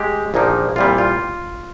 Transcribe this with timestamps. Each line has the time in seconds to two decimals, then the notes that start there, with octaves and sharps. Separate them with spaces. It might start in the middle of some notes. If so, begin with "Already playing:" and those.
Already playing: G#3 G4
0.34 A#1 A#2 F3 A#3 D#4
0.76 C2 A#2 G3 F4
0.98 F4